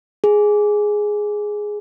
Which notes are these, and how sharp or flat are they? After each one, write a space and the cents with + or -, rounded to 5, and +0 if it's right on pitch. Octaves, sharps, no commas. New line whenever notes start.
G#4 +5